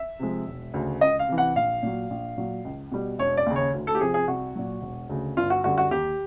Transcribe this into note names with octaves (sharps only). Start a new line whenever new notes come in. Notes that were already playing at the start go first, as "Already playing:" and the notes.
Already playing: E5
C3 F3 G#3
E1
D2 C#3
C#2 D#5
F5
C3 E3
F#5
A#1 F5
A#2 F#3
A#1
A#2 F#3
C#2
B2 G3
E1 C#5
D5
D#2 C#3
C#5
D2
A4
G4
C3 F3 G#4
G#4
C2 F#4
A#2 F#3
E1
D2 C#3
G1 F4
F#4
F#2 D3 G3 F#4
F#4
D#2 G4